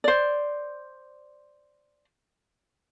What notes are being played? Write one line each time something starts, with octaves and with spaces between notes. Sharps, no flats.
C5 D5